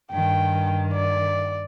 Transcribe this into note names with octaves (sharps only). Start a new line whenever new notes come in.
G2 D#3 G5
D5